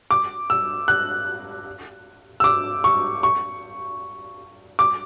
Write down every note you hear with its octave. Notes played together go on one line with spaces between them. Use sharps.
D6
E6
F#6
E6
D6
C#6
C#6
D6